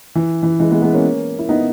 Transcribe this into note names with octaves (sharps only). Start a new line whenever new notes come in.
E3
E3
E3 G#3
G#3 B3
G#3 B3
A#3 C#4
E4
B3 D#4